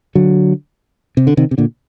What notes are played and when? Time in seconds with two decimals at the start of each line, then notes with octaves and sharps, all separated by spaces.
0.15 D3 F#3
1.17 C3
1.27 D3
1.37 C3 D#3
1.51 C3
1.58 A#2 D3